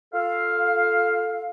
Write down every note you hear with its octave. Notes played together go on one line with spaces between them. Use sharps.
F4 A4 F5